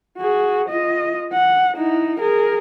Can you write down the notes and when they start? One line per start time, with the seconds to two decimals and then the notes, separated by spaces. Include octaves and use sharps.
0.17 F#4 G#4
0.69 F4 D#5
1.32 F#5
1.76 D#4 E4
2.20 G#4 A#4